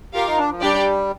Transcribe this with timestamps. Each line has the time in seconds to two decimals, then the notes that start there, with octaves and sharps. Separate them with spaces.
0.14 F4 G4 A#4 F5
0.27 D#4
0.38 D4
0.50 F3
0.62 G3 D4 G4 D5 G5